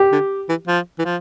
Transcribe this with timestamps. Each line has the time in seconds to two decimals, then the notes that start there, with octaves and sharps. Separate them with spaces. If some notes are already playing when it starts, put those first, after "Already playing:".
Already playing: G4
0.12 D3
0.49 E3
0.68 F3
0.99 E3
1.05 F3